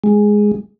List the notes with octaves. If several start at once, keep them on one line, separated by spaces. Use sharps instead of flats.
G#3